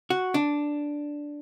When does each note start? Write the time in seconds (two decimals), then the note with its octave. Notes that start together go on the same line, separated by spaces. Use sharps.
0.10 F#4
0.34 D4